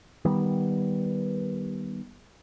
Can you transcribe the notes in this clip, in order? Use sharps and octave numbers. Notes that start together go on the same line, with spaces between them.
D#3 G3 B3